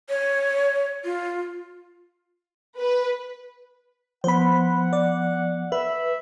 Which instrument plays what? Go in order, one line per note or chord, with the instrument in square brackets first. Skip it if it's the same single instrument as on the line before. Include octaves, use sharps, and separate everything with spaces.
[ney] C#5
F4
[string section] B4
[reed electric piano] F3 B3 [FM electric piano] C5 B5 [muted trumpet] F#5
[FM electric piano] D5
[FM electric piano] B4 [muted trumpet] E5